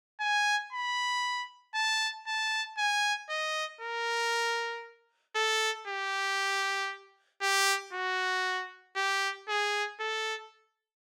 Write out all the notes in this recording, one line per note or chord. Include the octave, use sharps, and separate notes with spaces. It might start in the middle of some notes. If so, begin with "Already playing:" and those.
G#5
B5
A5
A5
G#5
D#5
A#4
A4
G4
G4
F#4
G4
G#4
A4